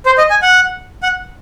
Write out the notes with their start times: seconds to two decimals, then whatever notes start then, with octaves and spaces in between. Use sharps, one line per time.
0.06 C5
0.18 D#5
0.30 G#5
0.42 F#5
1.03 F#5